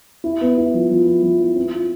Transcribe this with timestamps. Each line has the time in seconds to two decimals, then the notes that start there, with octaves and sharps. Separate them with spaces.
0.24 E4
0.41 B3
0.58 E4
0.74 F3
0.90 F3
1.06 F3
1.23 F3
1.40 E4
1.56 C4
1.73 F4